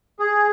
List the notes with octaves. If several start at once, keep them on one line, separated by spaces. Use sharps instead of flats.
G#4